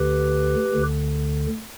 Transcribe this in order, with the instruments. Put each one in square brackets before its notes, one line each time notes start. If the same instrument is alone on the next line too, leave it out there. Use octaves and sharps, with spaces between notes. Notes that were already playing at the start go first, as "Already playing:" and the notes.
Already playing: [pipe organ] D2 D3 G4 B4
D2 D3